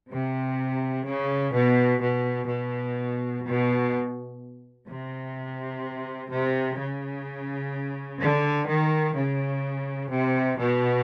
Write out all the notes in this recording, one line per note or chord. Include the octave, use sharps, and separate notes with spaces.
C3
C#3
B2
B2
B2
B2
C3
C3
C#3
D3
D#3
C#3
C3
B2